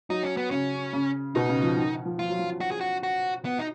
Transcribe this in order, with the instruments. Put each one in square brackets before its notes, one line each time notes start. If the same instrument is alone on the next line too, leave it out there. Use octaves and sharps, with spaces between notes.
[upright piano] F#3 [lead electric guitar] D#4
[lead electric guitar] C#4
B3
[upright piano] C#3 [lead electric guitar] C#4
[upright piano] C#3
[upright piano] B2 [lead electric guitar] D#4
[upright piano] C#3
F3
D#3
F3
[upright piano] F3 [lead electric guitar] F4
[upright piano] F#3
F3
[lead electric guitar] F#4
G#4
F#4
F#4
B3
D#4